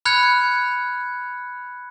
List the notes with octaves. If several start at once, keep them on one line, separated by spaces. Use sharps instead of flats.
B5 F6 F#6 G#6 C#7